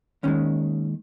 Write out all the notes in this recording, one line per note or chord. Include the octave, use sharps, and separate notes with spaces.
D#2 D#3 G#3 C#4